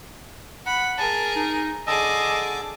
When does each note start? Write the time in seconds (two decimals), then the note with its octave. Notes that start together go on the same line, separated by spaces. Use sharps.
0.66 F#5 B5
0.98 G#4 A#4 A5
1.36 D#4
1.87 D3 G#4 D#5 A5 D6 E6